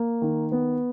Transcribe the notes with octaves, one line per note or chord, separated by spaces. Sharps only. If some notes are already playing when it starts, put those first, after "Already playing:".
Already playing: A#3
D#3
B3